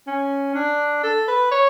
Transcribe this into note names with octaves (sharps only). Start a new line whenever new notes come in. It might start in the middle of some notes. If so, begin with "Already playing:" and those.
C#4
D4
A4
B4
C#5